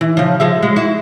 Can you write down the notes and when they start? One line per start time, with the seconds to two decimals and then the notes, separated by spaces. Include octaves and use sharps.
0.01 E3
0.17 C#3 F3
0.40 F3 G#3 E5
0.63 G#3
0.76 E4 F#4